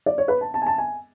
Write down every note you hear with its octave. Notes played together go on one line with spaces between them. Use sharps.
D5
C#5
B4
A5
A5
G#5
A5
G#5